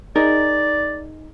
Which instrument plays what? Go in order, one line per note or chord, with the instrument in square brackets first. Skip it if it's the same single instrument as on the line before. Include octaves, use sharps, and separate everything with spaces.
[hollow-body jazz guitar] D#4 G#4 A#4 [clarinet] D5